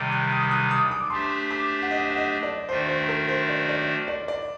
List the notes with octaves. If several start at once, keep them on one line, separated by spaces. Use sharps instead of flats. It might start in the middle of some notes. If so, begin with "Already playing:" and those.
Already playing: C3 D#3 G3 D6
F#6
D#6
D#6
F#6
D#6
D6
A3 D4 G4 C5 C6
D6
F#5
D#5
F#5
D#5
D5
D#3 A3 D4 F#4 C5
C5
C5
A#4
C5
D5
D5
D5
D5